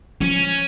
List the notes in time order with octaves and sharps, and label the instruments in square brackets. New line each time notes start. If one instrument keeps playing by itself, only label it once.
[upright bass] F3 [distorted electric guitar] C#4